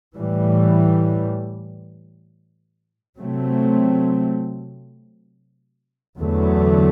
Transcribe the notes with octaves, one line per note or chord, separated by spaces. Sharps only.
A2 E3 G3
C3 F#3 A3 C4
E2 D3 F#3 A3